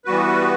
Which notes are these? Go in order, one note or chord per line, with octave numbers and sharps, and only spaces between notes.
E3 G3 B3 F#4 B4